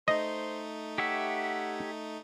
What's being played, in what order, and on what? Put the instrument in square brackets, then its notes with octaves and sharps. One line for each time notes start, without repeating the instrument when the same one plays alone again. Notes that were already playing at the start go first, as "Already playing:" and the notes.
[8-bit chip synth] A3 D#4 [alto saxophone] C5 [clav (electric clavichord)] D#5
[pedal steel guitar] G4 C#5 E5 [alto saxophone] F#5